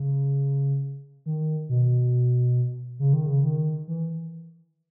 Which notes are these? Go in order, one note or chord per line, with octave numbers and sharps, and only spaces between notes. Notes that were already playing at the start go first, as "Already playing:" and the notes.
Already playing: C#3
D#3
B2
C#3
D#3
C#3
D#3
E3